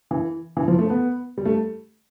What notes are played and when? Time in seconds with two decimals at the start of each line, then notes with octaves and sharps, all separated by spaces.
0.11 E3
0.57 E3
0.68 F3
0.79 A3
0.90 B3
1.38 G3
1.45 A3